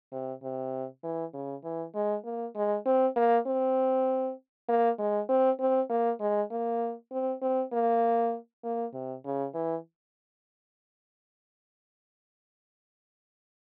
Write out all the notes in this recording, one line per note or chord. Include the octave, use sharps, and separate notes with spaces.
C3
C3
E3
C#3
E3
G#3
A#3
G#3
C4
A#3
C4
A#3
G#3
C4
C4
A#3
G#3
A#3
C4
C4
A#3
A#3
C3
C#3
E3